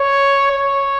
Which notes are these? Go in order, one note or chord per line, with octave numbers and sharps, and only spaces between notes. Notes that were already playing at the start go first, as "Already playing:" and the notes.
Already playing: C#5
C#5